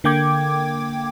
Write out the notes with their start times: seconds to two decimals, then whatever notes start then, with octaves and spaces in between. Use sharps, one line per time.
0.04 D3 A#3 G5 D6 G#6